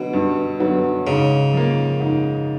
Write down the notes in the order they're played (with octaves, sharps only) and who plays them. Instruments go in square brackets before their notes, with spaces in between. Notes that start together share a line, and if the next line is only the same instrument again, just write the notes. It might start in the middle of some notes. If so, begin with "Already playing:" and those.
Already playing: [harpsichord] B2 [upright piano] D3 F#3 B3
[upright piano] G2
D3 F#3 B3
[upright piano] G#2 [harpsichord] C#3
[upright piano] F3 A#3
G#2